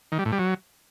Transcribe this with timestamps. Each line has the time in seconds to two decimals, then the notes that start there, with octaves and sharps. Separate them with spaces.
0.12 D#3
0.19 G3
0.25 A2
0.32 G3
0.39 F#3